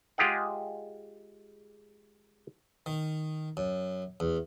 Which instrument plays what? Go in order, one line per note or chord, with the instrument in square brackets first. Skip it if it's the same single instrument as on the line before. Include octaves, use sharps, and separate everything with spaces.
[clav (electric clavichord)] G#3 F4 G4 G#4 D#5 F#5
[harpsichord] D#3
F#2
E2